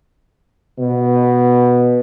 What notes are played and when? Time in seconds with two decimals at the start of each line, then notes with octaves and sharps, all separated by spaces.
0.78 B2